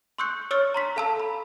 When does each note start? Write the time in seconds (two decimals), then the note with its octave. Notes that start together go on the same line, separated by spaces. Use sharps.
0.18 C6 C#6 E6 F#6 G6 C#7
0.51 C#5 C#6 E6 F6 A6 C#7
0.74 A#5 C6 B6
0.96 A4 F5 A5 A#5 E6
1.20 B5